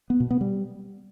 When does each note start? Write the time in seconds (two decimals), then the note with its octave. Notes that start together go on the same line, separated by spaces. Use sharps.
0.10 B3
0.20 B2
0.30 B3
0.41 G3